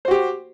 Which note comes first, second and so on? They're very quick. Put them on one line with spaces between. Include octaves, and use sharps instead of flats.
C5 F#4 G4